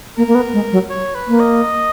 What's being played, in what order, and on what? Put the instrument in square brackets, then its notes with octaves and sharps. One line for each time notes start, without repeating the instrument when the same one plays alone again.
[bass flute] A#3 [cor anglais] A#4
[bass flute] A#3
B3
G#3
F#3
[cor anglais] C#5
B4
[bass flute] A#3
[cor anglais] D#5